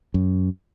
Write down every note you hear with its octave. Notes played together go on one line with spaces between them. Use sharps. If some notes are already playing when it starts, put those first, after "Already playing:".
F#2